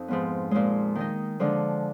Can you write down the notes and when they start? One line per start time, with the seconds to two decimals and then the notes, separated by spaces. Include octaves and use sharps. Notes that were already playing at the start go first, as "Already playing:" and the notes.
Already playing: F2 D#4
0.08 G#2 F3 B3
0.51 A#2 F3 G#3
0.95 D#3 G#3 D#4
1.40 D3 F3 G#3 D4